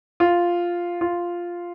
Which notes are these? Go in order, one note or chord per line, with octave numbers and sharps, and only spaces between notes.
F4
F4